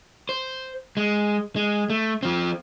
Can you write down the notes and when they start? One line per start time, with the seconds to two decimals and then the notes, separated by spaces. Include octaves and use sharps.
0.29 C5
0.97 G#3
1.56 G#3
1.90 A3
2.23 F3 C4